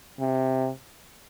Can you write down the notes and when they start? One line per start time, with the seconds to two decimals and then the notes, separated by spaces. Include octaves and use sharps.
0.20 C3